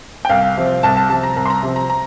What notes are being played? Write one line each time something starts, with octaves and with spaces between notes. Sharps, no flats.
G5
C2 F5
C3 F3
C2 A5
A5
C3 F3 A5
A#5
C2 A#5
C6
A#5
C3 F3
A#5
A#5